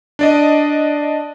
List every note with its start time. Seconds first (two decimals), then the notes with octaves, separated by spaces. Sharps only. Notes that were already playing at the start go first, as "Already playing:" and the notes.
0.19 D4 D5 D#5